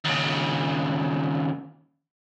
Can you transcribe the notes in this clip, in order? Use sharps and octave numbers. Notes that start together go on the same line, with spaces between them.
D#2 C#3